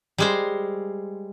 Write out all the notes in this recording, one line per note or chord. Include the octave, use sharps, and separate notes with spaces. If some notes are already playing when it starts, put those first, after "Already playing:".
G3 G#3 C5